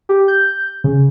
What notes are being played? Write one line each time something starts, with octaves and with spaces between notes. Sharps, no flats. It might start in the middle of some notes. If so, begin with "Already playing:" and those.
G4
G6
C#3